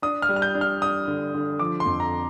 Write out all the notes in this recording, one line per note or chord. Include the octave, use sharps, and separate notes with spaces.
D4 D#6
F6
G3
F6
G6
D4
F6
D4 D#6
D3
D3
F3 D6
C6
F2
A#5